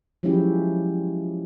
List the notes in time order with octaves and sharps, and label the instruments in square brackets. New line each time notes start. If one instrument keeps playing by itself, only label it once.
[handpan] F3 F#3 G#3 C#4 E4 G4